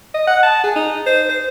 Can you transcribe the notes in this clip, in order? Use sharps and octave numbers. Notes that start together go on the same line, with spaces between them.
D#5
F#5
A5
G#4
D#4
C5
C5